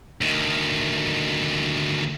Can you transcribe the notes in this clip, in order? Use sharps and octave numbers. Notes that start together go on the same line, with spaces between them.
D2 D#3